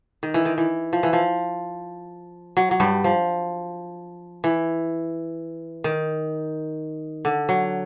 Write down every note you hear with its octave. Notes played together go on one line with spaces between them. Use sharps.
D#3
E3
D#3
E3
F3
E3
F3
F#3
F#3
G2 G3
F3
E3
D#3
D3
F#3